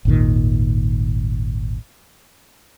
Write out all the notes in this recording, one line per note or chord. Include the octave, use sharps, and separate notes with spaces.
G#1 D#2 A#2 D#3